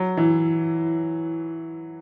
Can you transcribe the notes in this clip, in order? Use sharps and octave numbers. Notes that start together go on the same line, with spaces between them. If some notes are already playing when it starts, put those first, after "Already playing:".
Already playing: F#3
E3